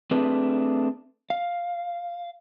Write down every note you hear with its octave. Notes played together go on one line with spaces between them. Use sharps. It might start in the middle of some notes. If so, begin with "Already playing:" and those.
A3 C4 D4 G#4 B4
F5